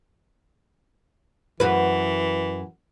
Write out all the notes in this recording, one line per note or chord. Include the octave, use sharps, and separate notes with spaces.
F#2 E3 F#4 B4